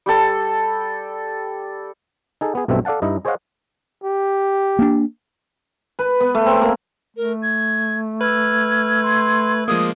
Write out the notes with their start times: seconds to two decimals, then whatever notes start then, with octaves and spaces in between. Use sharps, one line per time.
0.06 G3 G4 A4
2.41 D#4 G#4 A4
2.55 B3 G#4
2.68 B1 G2 B2 A3 C4 E5
2.85 A4 D5 F5 F#5 A5
3.02 G2 D#4 E4 D#5
3.25 G#4 C5 C#5 D#5 F5 F#5
4.04 G4
4.79 A#3 D4
5.99 B4
6.20 B3
6.35 A3
6.46 C4
6.61 A#3
7.17 A3 A#4
7.42 G#6
8.21 B4 E6 F6 G#6
9.02 C6
9.68 F3 G#3 A#3 D#6